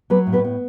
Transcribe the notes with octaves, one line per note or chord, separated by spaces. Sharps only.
F#3 B3 B4
A2
B3 B4
B3